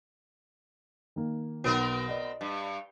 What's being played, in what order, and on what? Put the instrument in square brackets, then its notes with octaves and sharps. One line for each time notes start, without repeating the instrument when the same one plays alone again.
[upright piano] D#3 A#3
[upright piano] B1 B2 [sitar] B3 C4 A#4
[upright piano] D5 D#5
[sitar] G2